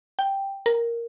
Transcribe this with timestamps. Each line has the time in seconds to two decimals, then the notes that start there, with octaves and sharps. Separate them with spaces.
0.19 G5
0.66 A#4